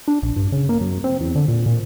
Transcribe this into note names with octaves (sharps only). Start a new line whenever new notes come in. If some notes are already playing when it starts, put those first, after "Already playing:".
D4
A#1
G2
C#3
A#3
F#2
C4
E2
D3
A#2
A#2